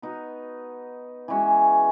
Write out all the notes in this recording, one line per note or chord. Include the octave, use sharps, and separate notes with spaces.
B3 D#4 F#4
E3 G#3 C#4 F#4